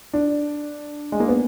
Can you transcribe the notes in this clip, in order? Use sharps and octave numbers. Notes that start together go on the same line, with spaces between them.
D4
G#3
A#3
B3